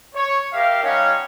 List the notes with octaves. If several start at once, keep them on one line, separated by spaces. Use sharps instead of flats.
C#5
G4 A#4 E5 F5
G3 C#4 D#4 C#5 F5 F#5